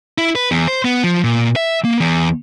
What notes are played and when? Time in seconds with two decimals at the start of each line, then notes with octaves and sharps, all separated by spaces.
0.18 E4
0.35 B4
0.51 E2
0.68 C5
0.85 B3
1.04 F3
1.24 A#2
1.56 E5
1.84 A#3
2.00 E2